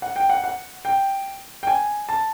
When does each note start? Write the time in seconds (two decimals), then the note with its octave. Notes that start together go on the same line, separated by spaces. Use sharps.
0.02 F#5
0.16 G5
0.29 F#5
0.44 F#5
0.85 G5
1.63 G5
1.67 G#5
2.09 A5